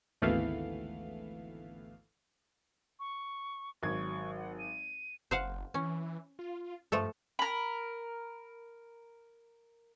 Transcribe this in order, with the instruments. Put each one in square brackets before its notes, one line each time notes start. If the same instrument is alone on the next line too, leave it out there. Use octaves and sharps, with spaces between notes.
[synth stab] G#1 D2 E3 A3 B3 F5
[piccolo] C#6
[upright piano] G#1 F#3 G#6 [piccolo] C#6
[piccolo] F#5
D#7
[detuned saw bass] F#1 [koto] C5 F5 F#5
[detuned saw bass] E3 [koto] C#4
[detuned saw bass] F4
[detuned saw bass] G2 [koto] F3 A3 A4
[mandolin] A#4 B5